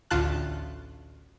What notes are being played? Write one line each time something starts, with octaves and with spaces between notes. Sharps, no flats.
A1 D2 F4 A5 F#6